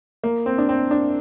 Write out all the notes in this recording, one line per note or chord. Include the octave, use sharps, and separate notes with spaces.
A#3
C4
D4
C4
D4